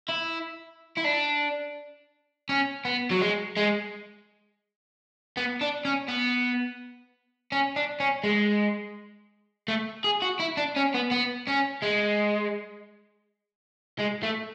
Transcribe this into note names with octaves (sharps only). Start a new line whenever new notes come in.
E4
E4
D4
C#4
B3
F#3
G#3
G#3
B3
D4
C#4
B3
C#4
D4
C#4
G#3
A3
G#4
F#4
E4
D4
C#4
B3
B3
C#4
G#3
G#3
A3